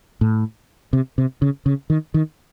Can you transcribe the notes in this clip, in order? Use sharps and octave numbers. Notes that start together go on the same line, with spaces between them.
A2
C3
C3
C#3
C#3
D#3
D#3